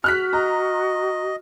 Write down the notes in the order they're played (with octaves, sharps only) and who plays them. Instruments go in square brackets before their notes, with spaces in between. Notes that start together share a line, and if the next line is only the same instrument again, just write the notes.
[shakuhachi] F#4 [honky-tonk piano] F6 F#6 B6
[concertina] D#5 [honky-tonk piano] A#5